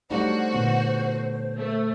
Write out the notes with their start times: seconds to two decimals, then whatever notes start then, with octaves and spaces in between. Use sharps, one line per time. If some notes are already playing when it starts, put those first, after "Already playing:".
0.11 F#3 G3 A3 D4 D#4 F#4 C5
0.53 A#2 D3 B3
1.58 A3